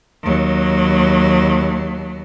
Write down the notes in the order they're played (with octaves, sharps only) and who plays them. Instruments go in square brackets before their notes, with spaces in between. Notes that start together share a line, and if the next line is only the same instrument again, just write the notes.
[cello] D#2 F#3